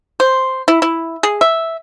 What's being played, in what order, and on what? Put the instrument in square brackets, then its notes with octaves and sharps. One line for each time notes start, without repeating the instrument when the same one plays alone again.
[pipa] C5
E4
E4
G#4
E5